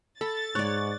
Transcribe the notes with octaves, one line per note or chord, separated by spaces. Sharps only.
A4 B5 A6
G#2 C#5 D5 C#6 F#6